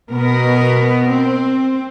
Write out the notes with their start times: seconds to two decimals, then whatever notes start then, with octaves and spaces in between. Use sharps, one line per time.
0.11 B2 B3 A#4
1.11 C4